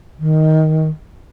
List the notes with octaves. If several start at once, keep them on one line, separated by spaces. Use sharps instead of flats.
D#3